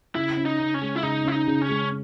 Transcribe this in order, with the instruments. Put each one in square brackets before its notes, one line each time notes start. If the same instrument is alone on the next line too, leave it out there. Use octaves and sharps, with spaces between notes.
[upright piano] C#3 [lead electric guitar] E4
[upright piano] C#4
[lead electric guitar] D#4
[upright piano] C#3
[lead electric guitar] C#4
[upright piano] G#3
[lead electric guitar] E4
[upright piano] C#3 [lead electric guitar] D#4
[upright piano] C#4 [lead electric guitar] E4
[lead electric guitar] D#4
[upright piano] C#3
[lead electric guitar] C#4
[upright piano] G#3